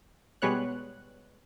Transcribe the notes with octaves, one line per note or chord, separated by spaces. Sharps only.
B2 G3 G#3 B3 C#5 F#6